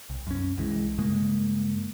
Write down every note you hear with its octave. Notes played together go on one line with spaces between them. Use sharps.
C2
F#2 C#4
C2 E3 G#3
G2 C#3 G#3 A#3